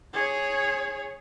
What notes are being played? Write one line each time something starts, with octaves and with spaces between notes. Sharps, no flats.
G#4 C#5